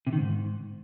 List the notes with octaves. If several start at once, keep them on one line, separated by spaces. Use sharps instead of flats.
C3
D#3
G#2